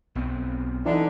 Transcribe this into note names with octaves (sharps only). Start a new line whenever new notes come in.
B1 B3 C4
D3 E3 D4 D#4